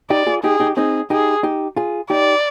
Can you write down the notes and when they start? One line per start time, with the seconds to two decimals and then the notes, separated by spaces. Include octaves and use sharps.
0.10 D#4 G4 D5
0.27 F4 G#4
0.44 D#4 G4 G#4
0.60 D#4 G4
0.77 C4 D#4 G#4
1.10 D#4 G4 G#4
1.43 D#4 G4
1.76 F4 G#4
2.10 D#4 G4 D5